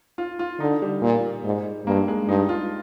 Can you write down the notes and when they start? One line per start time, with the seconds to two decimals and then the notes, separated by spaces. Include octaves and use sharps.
0.18 F4
0.39 F4
0.60 D3 D#4
0.82 G3
1.02 A#2
1.44 G#2
1.86 G2 A#3
2.08 G#3
2.28 G2 D#4
2.49 F4